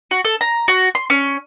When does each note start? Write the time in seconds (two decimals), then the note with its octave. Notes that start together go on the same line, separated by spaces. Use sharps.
0.11 F#4
0.25 A4
0.41 A#5
0.68 F#4
0.95 C6
1.10 C#4